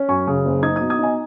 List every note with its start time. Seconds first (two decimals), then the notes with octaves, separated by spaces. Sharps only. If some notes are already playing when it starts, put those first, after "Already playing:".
Already playing: C#4
0.08 F#2 G#5 C#6
0.27 C#3
0.45 F#1
0.63 D#4 D#6 G#6
0.76 B2 D#6 G#6
0.90 D#6 G#6
0.99 D#4 D#5 G#5